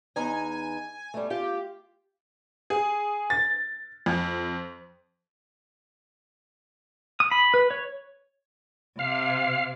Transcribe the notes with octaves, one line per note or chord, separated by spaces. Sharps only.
E2 D#4 D#5 G#5
G3 A3
F4 G4
G#4
A6
F2
D#6
B5
B4
C#5
C3 F5